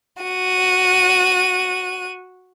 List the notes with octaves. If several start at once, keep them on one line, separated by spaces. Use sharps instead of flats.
F#4 D#7